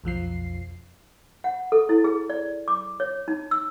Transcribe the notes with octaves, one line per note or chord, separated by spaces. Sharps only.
B1 F2 F3 C7
F#5
A4
E4
G#4
D5
D6
C#5
D#4
E6